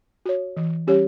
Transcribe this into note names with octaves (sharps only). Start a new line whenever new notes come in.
F#4 C#5
E3
G3 C#4 G4 C#5